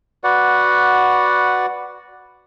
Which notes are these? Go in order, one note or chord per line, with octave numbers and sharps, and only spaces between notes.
F#4 B4 D5 F#5